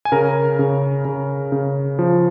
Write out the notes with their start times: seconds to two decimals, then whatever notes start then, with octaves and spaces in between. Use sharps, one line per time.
0.05 G#5
0.12 C#3 A#4 A#5
0.59 C#3
1.05 C#3
1.52 C#3
1.99 F3